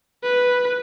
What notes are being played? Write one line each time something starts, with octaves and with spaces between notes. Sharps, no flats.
B4